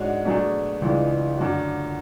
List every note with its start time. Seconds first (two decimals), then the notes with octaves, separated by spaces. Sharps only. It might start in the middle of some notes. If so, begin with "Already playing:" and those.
Already playing: G#2 G#3 D4 F#4 C#5
0.25 B2 F#3 A3 D4 G#4
0.82 C#2 C#3 E3 G#3 D4
1.38 F#2 D3 A3 D4 F#4